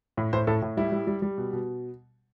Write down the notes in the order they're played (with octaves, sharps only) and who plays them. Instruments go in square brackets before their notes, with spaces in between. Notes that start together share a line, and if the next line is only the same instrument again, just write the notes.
[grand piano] A2
A2 C5
A2 A4
A2
G3 E4
G3
G3
G3
B2
B2